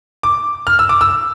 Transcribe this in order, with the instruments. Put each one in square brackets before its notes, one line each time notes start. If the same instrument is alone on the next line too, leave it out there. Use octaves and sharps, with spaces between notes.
[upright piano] D6
F6
E6
D6
E6